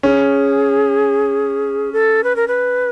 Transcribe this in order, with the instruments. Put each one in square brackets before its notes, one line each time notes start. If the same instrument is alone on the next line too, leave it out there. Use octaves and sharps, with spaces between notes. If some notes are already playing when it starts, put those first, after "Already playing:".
[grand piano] C#4 [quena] G#4
[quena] A4
B4
A#4
B4